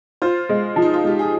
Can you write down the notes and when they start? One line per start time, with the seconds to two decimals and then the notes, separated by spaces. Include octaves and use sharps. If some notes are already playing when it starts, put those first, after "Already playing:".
0.22 F4 C5
0.49 G#3
0.76 F3
0.82 D#4
0.94 F4
1.04 G#3 G4
1.19 G#4